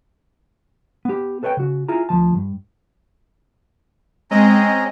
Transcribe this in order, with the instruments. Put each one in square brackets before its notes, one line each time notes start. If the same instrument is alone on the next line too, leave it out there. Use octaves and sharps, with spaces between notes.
[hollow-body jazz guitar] B3 G4
A4 B4 C#5 D#5 G5
C#3 F#4
E4 F4 G#4 A#5
D2 F3 A5
G2
[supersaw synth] G#3 C4 D#5 [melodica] C#4 A#5